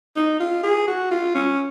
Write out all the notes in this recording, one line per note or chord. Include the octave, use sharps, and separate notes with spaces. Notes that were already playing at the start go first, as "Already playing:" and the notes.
D#4
F4
G#4
F#4
F4
C#4